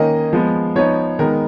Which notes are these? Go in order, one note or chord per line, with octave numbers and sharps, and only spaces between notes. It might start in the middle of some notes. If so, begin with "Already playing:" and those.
Already playing: D#3 A#3 C#4 D#5
F3 G#3 B3
F3 B3 D#4 C#5
D#3 G#3 B3 D#4 A#4